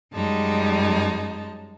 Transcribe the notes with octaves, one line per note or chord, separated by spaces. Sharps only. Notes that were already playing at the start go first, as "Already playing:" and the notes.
F#2 G3 G#3 D#4 A5